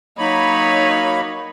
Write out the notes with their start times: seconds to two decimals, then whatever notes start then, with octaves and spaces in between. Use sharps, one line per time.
0.18 F#3 A#3 D#4 C#5 B5